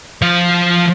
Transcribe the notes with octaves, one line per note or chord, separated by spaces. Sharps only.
F3 F5